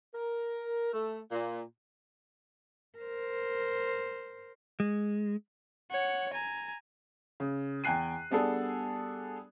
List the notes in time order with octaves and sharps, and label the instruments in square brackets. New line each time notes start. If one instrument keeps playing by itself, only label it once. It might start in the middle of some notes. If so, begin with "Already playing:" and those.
[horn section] A#4
A3
A#2
[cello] A#4 C5
[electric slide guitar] G#3
[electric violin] C#5 F#5
G#5 A#5
[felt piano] C#3
E2 G5 G#5 F#6 C7 D#7
G3 B3 D4 G#4 A4